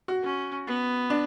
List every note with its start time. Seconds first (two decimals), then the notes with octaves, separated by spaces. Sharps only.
0.08 F#4
0.23 C#4
0.67 B3
1.10 D4